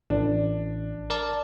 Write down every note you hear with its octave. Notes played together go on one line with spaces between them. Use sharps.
A1 D4
A#4 D5 A5